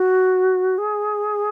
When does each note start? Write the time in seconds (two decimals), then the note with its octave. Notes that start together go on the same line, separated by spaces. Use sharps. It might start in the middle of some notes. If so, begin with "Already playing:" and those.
Already playing: F#4
0.77 G#4